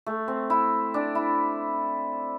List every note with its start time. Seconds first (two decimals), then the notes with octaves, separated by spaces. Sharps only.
0.06 A3
0.28 C4
0.50 E4
0.94 D4
1.15 E4